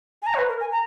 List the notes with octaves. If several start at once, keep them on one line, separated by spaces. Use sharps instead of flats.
G#5
A#5
C#5
B4
A#4
G#5
A#5